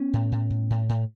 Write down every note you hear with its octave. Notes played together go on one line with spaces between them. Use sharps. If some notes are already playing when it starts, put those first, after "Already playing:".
Already playing: B3 C#4
A2
A2
A2
A2
A2